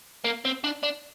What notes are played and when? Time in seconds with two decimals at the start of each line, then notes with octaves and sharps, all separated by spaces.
0.24 A#3
0.45 C4
0.64 D4
0.83 D4